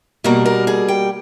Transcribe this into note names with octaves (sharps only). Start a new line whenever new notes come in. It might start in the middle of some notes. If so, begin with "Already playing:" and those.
B2 G3 A#3 A#4
A#4
G#4
G5